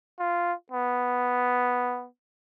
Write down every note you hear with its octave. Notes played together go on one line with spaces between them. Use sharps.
F4
B3